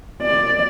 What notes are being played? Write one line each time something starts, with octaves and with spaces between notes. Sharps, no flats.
D5